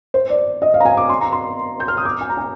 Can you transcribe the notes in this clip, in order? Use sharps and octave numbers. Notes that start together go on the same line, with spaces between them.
C5
D5
D#5
F5
A#5
G#5
D6
C6
A#5
C6
G6
F6
D#6
D6
G#5
A#5
G#5